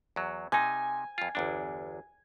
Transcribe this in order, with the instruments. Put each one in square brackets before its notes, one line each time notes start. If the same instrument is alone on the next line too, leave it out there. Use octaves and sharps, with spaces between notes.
[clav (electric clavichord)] E2 F#3
[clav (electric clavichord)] C3 D#4 [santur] G#5
[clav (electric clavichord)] F2 F4
G1 E2 D4